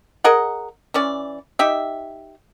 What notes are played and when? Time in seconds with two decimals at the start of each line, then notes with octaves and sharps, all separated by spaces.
0.24 G#4 A#4 D#5 F#5
0.94 E3 C#4 D5
1.59 D#4 G4 E5